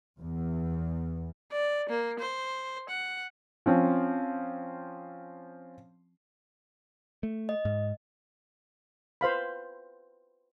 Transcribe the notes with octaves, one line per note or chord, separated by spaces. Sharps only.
E2
D5
A#3
C5
F#5
F3 C4 C#4
A3
D#5
G#2
B4 C5 F5 B5